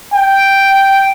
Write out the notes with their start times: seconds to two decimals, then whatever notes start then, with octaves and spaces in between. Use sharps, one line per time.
0.14 G5